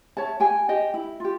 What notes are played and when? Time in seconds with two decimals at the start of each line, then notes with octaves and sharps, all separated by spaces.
0.17 C#5 E5 A5
0.40 G4 G5 G#5
0.69 G4 D#5 G5
0.94 E4
1.20 F4 G4